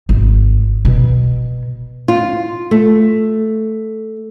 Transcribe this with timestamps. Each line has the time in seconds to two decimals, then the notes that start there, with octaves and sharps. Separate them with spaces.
0.09 G#1
0.85 B2
2.08 F4
2.71 A3